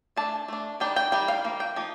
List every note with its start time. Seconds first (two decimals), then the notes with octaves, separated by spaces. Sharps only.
0.17 A3 D4 A5
0.48 A3 D4
0.80 D#3 G3 D4 G5
0.96 G5
1.12 D#3 G3 D4 G5
1.28 F5
1.44 F3 A#3
1.60 G5
1.76 F3 A#3 D#4